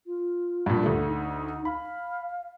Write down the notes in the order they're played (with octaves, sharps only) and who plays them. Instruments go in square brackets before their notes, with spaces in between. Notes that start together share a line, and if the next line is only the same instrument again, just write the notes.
[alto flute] F4
[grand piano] G2 A#2
[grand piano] D2 A3 [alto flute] G4
[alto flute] D#4
[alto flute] F5 [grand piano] B5